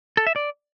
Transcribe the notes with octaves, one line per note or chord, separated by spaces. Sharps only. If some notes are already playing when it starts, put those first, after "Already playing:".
A4
E5
D5